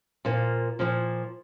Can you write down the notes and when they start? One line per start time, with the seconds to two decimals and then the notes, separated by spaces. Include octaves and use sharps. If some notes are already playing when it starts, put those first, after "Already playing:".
0.25 A#2 F3 A#3
0.79 A#2 F3 A#3